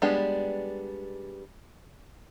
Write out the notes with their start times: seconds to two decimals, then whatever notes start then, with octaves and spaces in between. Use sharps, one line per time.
0.02 G3 G#3 B3 D4 G4